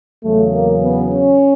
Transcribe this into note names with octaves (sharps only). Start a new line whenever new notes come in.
E2 C#3 F#3 A3
A#3
B3
C#4